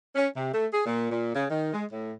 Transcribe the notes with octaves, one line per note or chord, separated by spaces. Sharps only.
C#4
C3
A3
G#4
A#2
A#2
C#3
D#3
G#3
A2